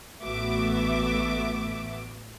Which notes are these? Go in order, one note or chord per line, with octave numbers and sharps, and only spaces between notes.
A1 A3 B3 F#4 E5 D6